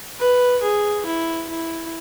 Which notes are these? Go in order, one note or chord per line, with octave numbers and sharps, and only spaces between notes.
B4
G#4
E4
E4